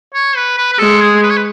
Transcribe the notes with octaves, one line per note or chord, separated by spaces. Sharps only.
C#5
B4
B4
B4
G#3 A4
G#4
B4
C#5
B4